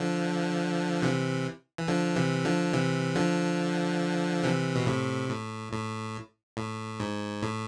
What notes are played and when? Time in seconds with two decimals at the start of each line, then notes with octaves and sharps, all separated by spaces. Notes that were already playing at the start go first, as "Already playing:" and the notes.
Already playing: D3 F3
1.02 C3 E3
1.78 E3
1.88 D3 F3
2.16 C3 E3
2.45 D3 F3
2.73 C3 E3
3.15 D3 F3
4.44 C3 E3
4.76 B2
4.86 A2 C3
5.30 A2
5.72 A2
6.57 A2
7.00 G#2
7.42 A2